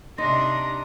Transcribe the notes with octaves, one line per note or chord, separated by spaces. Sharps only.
C3 D4 D#4 A#5 C6 A#6